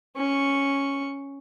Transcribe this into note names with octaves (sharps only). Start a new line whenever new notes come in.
C#4 C#6